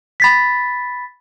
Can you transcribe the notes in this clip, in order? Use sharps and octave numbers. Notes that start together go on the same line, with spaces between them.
B5 A6 B6